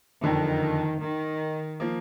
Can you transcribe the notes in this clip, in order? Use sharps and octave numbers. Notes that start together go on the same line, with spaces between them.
F#1 F2 D3 D#3
D#3
F3 A#3